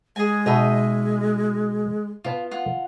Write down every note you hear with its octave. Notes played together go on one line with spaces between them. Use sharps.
G#3 G#4 G#5
B2 D#4 G#4 E5
B3 F4 G5 A5
F4 F#5